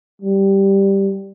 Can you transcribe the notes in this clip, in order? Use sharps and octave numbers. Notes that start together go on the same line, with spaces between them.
G3